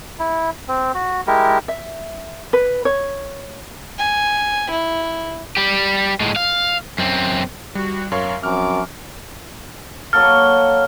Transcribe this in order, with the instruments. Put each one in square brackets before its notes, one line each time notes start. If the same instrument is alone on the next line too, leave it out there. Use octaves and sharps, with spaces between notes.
[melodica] E4
C4
F#4
G#3 E4 G4 A#4
[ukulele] E5
B4
C#5
[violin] G#5
E4
[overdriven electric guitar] G3 G4
A2 G#3
F5
F#2 C4
[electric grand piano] G3 [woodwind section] F#4
[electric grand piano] F#2 C#5 C#6 [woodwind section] A#4 F5 C6
[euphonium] F#2 [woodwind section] F3 C4 D6 [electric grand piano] F6
[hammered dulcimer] F#3 A#3 A4 [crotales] F6